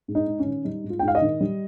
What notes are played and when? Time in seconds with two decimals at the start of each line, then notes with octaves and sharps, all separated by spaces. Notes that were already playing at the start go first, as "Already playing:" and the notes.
0.08 G#2
0.15 D#4
0.27 G#2
0.39 C#4
0.46 D#3
0.65 G3 D#4
0.84 G#2
0.90 F4
0.99 G5
1.03 G#2
1.08 F5
1.15 D#5
1.22 D#3
1.41 G3